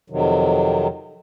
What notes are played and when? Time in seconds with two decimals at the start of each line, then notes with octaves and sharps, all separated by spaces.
0.10 F2 C3 D#3 F#3